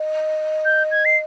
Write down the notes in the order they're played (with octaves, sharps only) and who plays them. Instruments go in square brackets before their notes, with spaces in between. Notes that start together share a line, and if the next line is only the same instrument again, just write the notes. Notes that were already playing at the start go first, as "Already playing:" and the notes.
Already playing: [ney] D#5
[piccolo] G6
G#6
C7